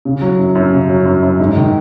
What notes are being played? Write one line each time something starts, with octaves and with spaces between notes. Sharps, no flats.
C#3
F#3
F#2
F#2
C#3
F#3
F#2
F#2
G#2
D#3